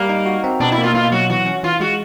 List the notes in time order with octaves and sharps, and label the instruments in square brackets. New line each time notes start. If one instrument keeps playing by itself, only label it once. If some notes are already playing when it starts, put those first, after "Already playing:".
Already playing: [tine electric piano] G3 [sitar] A#3
[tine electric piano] D#4
F#4
C4
[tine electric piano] B2 [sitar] D4
[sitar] E4
[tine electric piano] A#3
[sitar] F4
[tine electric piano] B2 [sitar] F4
[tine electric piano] F#3 [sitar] F#4
[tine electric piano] E3 [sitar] F#4
[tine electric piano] C#4
[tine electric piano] E3 [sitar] F4
[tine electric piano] G#3 [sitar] F#4